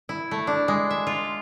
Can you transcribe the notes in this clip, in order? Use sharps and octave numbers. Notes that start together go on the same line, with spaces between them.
E4
A3
D4
G#3
E5
F4